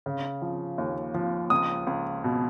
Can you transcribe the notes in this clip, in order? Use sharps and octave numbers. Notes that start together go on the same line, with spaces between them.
C#3
F3
D#2
F3
C#2 D#6
C#2
B2